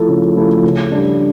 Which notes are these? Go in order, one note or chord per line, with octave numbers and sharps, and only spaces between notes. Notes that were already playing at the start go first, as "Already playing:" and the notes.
Already playing: F3 A3 E4 A4
C#3
F3 A3 E4 A4
C#3
G3 D4